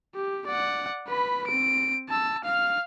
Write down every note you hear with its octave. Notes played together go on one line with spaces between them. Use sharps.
G4
D5 F#5
B4 B5
C4 D7
A5 E6
F5 F6